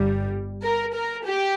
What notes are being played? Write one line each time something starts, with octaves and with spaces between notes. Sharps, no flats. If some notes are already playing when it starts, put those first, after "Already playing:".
Already playing: G1 G3
A#4
A#4
G4